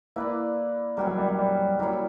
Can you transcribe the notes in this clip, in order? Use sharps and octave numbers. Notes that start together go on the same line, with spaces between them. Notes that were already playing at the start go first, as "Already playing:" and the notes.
A#3 E4 B4 D5
G3 C#4 F#4 A#4
F#3
G3
G3
G3
F#3 G3 A#3 E4 A#4